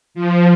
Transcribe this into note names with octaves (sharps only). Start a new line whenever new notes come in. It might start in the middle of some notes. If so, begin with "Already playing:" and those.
F3